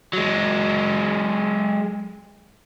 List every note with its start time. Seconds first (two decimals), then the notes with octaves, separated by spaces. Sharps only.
0.13 F#3 G#3